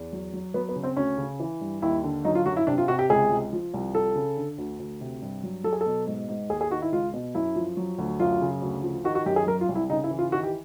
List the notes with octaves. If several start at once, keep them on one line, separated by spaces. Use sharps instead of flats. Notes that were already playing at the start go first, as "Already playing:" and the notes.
Already playing: E2
F#3
F#3
F#3 B3
B3
C#3
C4
D2 C#4
C#3
E3
G2
D#2 E4
D3
F#3 D#4
F4
F#2 F#4
E4
C3 D4
F4
C3 F#4
G4
C#2 G#4
C#2
F3
C2
F3 A4
C#3
D3
D2
D2
C3
G2
F#3
F#3 A4
G#4
A4
B2
G#2
G#2
D#2 G#4
G#4
D#3 F#4
E4
C#2 F4
B2
F#2 E4
F3
F#3
D2
F#2 F4
C#3
D2
F3
D#3 F#4
F#4
F#2 G4
G#4
F#3 A#4
F4
C2
E4
C#3 D#4
E4
E3
F4
D#3 F#4
G4